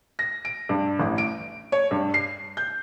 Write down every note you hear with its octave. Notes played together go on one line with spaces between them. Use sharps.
A#6
D7
G2
A1
D7
C#5
G2
C7
G6